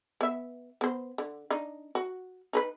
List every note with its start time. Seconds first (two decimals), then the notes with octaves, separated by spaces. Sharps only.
0.21 B3 E5
0.81 B3 C5
1.18 D3
1.50 D4 D#4
1.95 F#4
2.53 D#4 A#4 B4